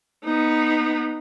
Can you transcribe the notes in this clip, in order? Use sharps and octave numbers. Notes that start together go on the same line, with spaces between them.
B3 D#4